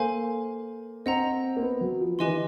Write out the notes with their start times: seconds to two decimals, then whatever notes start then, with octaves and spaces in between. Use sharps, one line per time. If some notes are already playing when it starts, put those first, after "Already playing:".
Already playing: A#3 A4 C5 F5 G#5 C6
1.06 C4 D#5 F#5 A#5
1.56 A#3
1.62 B3
1.81 F#3
2.01 F3
2.19 E3 G4 B4 D#5 G#5 C6
2.27 D#3